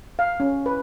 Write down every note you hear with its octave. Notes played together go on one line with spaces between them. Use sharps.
F5
C#4
B4